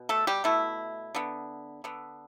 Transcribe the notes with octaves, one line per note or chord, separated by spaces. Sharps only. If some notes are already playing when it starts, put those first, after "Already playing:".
Already playing: B2
A3 A4
G3 G4
B2 A3 E4
D3 B3
D3 B3